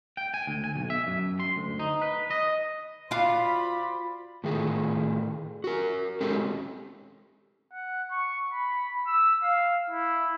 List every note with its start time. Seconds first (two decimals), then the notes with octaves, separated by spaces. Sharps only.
0.17 G5
0.34 G#5
0.47 D2
0.64 G#5
0.76 B1
0.90 E5
1.07 F#2
1.40 C6
1.56 D2
1.80 D#4
2.01 B4
2.31 D#5
3.11 F4 F#4 C5 D5 F5 B5
4.44 A2 D#3 A3 G#4
5.64 F#4 A#4
6.21 G#3 C4 C#4 D#4 G4 A4
7.73 F#5
8.11 C#6
8.53 B5
9.06 E6
9.43 F5
9.90 E4